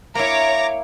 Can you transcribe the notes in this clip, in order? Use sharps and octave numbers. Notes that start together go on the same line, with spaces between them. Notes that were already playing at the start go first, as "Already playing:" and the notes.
A#3 E4 C#5 A#5 D6